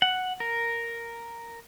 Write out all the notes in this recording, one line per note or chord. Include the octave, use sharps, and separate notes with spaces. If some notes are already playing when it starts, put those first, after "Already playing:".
F#5
A#4